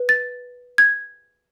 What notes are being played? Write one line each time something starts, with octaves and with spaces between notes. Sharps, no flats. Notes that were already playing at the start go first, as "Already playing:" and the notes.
Already playing: B4
A6
G#6